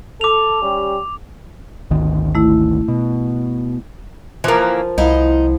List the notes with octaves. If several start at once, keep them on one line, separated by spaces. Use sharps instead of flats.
A4 D6 F7
G3 C#4 G4
G#1 D2 D#3
A3 E4
B2
E3 F3 A#3 A#4
C2 D#4 E4 F5 F#5